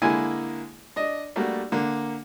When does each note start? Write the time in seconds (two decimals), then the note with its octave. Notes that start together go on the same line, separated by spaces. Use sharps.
0.02 D3 G#3 A#3 E4 G#5
0.96 D4 D#5
1.36 G3 A3 A#3 D4 F#4
1.72 D3 A#3